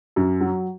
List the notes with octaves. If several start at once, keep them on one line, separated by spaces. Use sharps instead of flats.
F#2
F#3